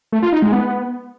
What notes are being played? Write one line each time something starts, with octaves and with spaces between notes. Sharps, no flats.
A3
F4
D#4
G#3
B3